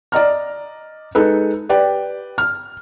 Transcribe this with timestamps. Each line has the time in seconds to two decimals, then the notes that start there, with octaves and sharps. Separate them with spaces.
0.12 D5 D#5 A#5 F6
1.15 G#3 D#4 A4 B4
1.69 G4 B4 D5 G5
2.38 F6